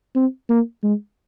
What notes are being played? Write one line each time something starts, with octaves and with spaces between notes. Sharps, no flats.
C4
A#3
G#3